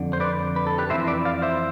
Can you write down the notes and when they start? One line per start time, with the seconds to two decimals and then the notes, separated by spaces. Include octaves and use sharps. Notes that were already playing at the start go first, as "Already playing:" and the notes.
Already playing: F2 D3
0.13 C5
0.20 B4 D5
0.56 B4
0.67 A4
0.78 G4 B4
0.90 F2 C3 E3 C5 E5
1.07 B4 D5
1.25 D5 F5
1.42 C5 E5